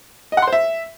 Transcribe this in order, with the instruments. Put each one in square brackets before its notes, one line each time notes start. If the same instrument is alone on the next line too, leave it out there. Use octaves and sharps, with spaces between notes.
[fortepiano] D#5
F#5
C6
C5
E5